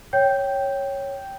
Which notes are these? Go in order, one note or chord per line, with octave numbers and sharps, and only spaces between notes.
C#5 G5 G6